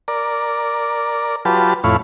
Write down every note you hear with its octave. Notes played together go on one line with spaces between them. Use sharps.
A#4 D5
F#3 F4 G4 B4 A5
F2 A2 E4 C#5 F5 B5